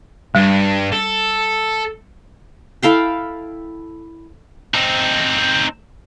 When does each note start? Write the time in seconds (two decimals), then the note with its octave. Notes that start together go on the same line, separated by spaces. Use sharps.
0.35 G2 G3
0.92 A4
2.83 E4 A4 F5 G5
4.74 C4 D#4